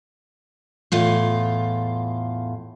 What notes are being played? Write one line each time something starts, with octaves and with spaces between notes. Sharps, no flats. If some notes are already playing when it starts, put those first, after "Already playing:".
E2 A2 F4